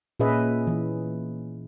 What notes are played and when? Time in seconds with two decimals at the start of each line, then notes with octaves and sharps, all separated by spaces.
0.20 A#2 C#4 G#4 B4 D#5 E5
0.67 E3